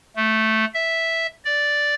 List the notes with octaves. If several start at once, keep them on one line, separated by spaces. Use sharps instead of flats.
A3
E5
D5